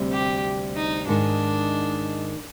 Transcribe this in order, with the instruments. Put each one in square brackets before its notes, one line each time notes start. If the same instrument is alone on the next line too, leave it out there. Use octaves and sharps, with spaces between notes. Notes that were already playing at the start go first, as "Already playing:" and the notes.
Already playing: [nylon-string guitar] D2 C3 G3 C4
[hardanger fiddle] G4
D#4
[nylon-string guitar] G#2 D#3 G#3 [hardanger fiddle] D4